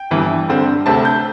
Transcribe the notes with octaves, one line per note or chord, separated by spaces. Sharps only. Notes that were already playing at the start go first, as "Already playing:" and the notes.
Already playing: G5
G1 G2 E3
G2 D3 C4
D2 C3 A3 C4 A5
G6